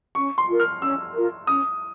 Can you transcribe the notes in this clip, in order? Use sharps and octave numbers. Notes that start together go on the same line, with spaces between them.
C#4 C#6
C6
F4 A#4
F6
C#4 E6
F4 A#4
C#4 D#6